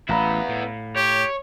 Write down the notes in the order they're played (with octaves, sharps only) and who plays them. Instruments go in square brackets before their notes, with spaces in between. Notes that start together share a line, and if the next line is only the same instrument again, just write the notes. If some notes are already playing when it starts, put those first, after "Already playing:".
[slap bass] A1 [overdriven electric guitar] B3 E4 [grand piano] F5 A#5 B5
[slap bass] A2
[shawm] G4 [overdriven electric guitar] C#5